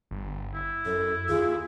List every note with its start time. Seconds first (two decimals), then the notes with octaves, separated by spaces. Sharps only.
0.11 G1
0.54 E4
0.86 F#2 A4
1.29 D#2 F4 G#4